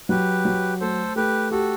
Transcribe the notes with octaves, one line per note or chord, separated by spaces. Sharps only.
F#3 G4 B4
F#3
A3 A4 C5
A3 G4 B4
F#4 G4 A4